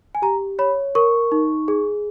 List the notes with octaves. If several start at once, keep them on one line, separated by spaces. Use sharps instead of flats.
G#5
G4 A#5
C#5 B5
A#4 C#6
D#4
G#4